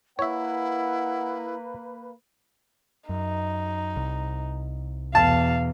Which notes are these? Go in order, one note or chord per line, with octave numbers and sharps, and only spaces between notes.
A#3 E4 B4 C#5 E5 F#5
F#2 D#4
C2
E2 B2 F5 A5